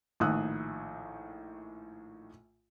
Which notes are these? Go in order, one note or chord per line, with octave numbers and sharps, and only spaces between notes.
A#1 A2 D#3 D#6 E6 F#6